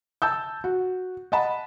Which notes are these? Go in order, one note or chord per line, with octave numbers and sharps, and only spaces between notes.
A5 E6 G6
F#4
D#5 F#5 A5 B5